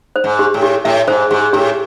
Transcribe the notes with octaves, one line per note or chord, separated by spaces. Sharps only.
C5
G#2
G4
A2
G4
A2 E5
G#2 C5
G#2 G4
A2 G4